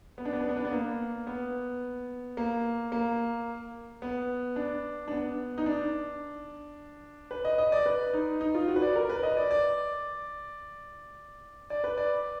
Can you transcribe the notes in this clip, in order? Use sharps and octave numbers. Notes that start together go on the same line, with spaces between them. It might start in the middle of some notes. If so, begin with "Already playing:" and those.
B3
D4
B3
D4
B3
D4
B3
A#3
B3
A#3
A#3
B3
D4
D4
B3
D#4
D4
B4
D#5
D#5
D5
B4
D#4
D#4
F4
F#4
B4
D5
A#4
B4
D#5
D5
D5
D5
B4
D5